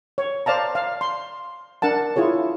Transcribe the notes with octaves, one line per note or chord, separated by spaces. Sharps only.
C#5
C5 D5 F5 A5 A#5
F5
C6
D4 A#4 F#5 A5
E4 F4 G#4 C#5